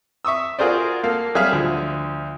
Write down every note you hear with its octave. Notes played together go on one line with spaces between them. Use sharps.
E5 C#6 D#6 E6
F4 F#4 G#4 A#4 C5 D5
A#3 A4 F5
F#3 G3 G#4 E5 F5 F6
D2 F3